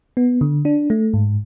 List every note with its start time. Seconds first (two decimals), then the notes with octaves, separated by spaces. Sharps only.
0.17 B3
0.41 D3
0.65 D4
0.90 A3
1.14 G#2